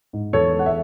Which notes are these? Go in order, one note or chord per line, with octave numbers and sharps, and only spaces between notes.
G#2
E2 A4 C#5
G#3
F#5
E5